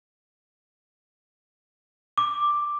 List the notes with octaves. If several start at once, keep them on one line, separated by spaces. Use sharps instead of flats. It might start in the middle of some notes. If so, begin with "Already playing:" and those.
D6